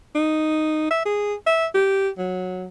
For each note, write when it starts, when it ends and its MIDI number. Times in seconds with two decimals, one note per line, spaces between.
0.15 0.88 63
0.91 1.02 76
1.05 1.34 68
1.46 1.66 76
1.74 2.09 67
2.18 2.67 54